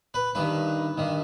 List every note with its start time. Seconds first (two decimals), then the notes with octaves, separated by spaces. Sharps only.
0.14 B4
0.35 G2 D#3 B4
0.98 G2 D#3